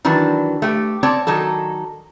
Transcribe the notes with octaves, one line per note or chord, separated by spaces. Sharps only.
D#3 E3 F#3 D4
A3 G4
C4 C#5 D5 A5
D#3 F#3 D#4 A4